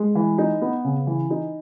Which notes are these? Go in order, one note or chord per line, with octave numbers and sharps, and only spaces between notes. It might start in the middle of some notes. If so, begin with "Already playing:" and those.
Already playing: G#3
E3
D#4
B3
C#3
E3
D#4